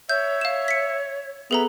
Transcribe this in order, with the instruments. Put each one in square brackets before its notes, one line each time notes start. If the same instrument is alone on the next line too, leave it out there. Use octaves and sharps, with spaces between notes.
[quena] C#5 [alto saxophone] E5 [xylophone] G6
[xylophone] F5 E7
B6 C#7
[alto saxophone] B3 [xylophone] G#4 A4 A#5 [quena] E5